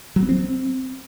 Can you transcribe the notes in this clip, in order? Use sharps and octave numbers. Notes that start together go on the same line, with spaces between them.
F#3
B3
C4